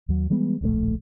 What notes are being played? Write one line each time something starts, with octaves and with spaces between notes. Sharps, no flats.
D#2 F#3
E3 G3 G#3 B3
D1 A#1 C3 A3